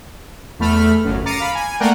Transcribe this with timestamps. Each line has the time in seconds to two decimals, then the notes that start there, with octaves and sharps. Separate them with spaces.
0.59 E2 A3 B5 F6
1.04 G1 F#2
1.25 A#5 D6 A6 C7 C#7 D#7
1.40 F5 B5
1.55 G#5
1.80 A3 A#3 A#4 D5 F#5 G5